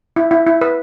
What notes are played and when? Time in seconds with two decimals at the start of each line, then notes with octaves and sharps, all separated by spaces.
0.16 E4
0.31 E4
0.47 E4
0.61 B4